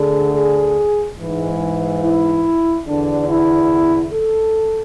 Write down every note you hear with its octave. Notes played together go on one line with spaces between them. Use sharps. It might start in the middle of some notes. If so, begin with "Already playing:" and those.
Already playing: D2 D3 G#4
G#4
G#2 E3
E4
E2 D3 D4
E4
A4